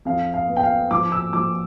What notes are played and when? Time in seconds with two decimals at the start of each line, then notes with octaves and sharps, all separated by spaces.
0.05 F2 F5
0.34 F5
0.48 B3
0.57 G5
0.63 F5
0.91 F3 D6
1.12 E6
1.33 F3 D6